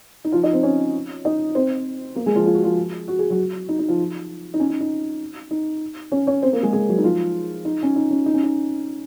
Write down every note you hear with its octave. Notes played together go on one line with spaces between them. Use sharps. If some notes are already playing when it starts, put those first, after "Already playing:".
D#4
F3 F4
D#4 D#5
C4 C5
C#4 C#5
D#4 D#5
C4 C5
A#3 A#4
G#3 G#4
F3 F4
F4
F#4
F3 F4
F#4
G#4
F#3 F#4
D#4
D#4
F3 F4
D#4
C#4
D#4
D#4
D#4
C#4 C#5
C#4 C#5
C4 C5
A#3 A#4
G#3 G#4
G#3 G#4
F#3 F#4
D#4
F3 F4
D#4
C#4
D#4
C#4
D#4
C#4
D#4